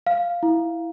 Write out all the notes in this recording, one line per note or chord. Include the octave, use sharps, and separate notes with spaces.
F5
E4